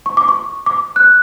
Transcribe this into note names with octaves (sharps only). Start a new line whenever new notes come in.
C#6
D6
C#6
D6
F#6